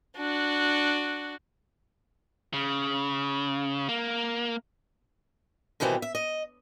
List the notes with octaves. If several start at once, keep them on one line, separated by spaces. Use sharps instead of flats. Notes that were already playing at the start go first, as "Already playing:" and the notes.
D4 F#4
C#3
A#3
B2 D#3 E3 G3 C4
E5
D#5